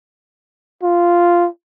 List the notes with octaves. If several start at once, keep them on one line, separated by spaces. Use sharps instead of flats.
F4